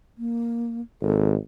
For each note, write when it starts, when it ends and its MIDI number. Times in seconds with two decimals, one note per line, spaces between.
0.18 0.81 58
1.02 1.35 32
1.02 1.30 69